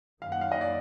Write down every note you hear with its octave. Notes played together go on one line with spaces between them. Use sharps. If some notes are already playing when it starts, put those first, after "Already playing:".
F#2 D#3 F#3 A#3 F5
F#5
F5
D#5
D5